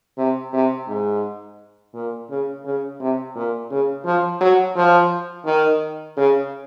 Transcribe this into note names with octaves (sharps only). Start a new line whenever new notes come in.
C3
C3
G#2
A#2
C#3
C#3
C3
A#2
C#3
F3
F#3
F3
D#3
C#3